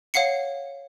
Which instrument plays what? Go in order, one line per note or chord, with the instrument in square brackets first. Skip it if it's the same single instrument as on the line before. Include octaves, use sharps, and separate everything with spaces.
[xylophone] C#5 F5 F#5 C7 C#7